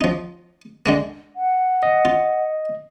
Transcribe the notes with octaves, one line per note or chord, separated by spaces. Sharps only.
F3 D#4
D3 G#3 A#3
F#5
D#5
F4